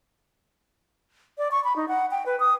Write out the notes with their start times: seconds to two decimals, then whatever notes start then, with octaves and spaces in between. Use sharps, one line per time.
1.38 D5
1.51 C#6
1.64 B5
1.76 D#4
1.88 F#5
2.11 G5
2.26 B4
2.40 D#6